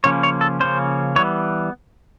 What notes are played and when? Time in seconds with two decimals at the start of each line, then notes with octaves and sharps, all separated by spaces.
0.04 C#3 F3 A#3 C#4 C#5
0.23 C#5
0.41 A4
0.60 C#3 F3 A#3 C#4 C5
1.16 E3 G3 B3 C#5